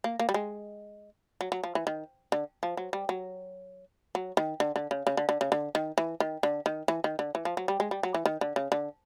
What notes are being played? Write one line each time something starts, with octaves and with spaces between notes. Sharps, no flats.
A#3
A#3
G3
G#3
F#3
F#3
F3
E3
D#3
D3
F3
F#3
G3
F#3
F#3
D#3
D3
D3
C#3
C#3
D3
D3
C#3
D3
D#3
E3
D#3
D3
D#3
E3
D#3
D3
E3
F3
F#3
G3
G#3
G3
F#3
E3
D#3
D3
C#3
D3